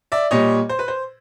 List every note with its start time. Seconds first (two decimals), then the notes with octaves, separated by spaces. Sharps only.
0.12 D5 E5
0.31 A#2 G3 C#5 D#5
0.69 C5
0.79 B4
0.88 C5